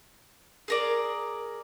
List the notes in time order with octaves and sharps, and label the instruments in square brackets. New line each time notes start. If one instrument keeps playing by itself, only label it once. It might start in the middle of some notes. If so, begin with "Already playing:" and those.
[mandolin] G#4 A#4 D5